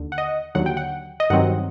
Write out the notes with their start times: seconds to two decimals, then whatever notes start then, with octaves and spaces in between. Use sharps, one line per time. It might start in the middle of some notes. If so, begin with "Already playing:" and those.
Already playing: D#2 D3
0.12 F#5
0.18 D#5
0.55 D#2 D3 F#3 F#5
0.66 G5
0.77 F#5
1.20 D#5
1.30 G2 D#3 F#3 C4 F#5